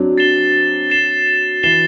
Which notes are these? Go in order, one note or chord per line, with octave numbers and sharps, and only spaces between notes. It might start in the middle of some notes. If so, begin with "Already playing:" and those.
Already playing: F#3 C4 D4
A6 C7 E7 G7
A6 C7 E7 G7
E3 A6 C7 E7 G7